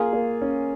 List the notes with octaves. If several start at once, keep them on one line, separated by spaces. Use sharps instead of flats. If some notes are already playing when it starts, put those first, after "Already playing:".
Already playing: A#3 F4 G#4
A#3
C#4